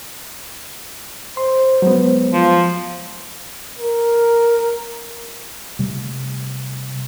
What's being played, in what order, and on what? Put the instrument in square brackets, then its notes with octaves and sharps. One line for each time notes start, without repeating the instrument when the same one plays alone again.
[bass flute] C5 [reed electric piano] C6
[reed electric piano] F#3 G#3 B3
[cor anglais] F3
[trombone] A#4
[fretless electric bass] C3 G3 A3